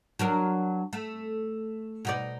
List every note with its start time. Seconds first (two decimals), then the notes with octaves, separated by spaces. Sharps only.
0.19 F#3 D4 A#4
0.93 A3
2.05 B2 D#4 D5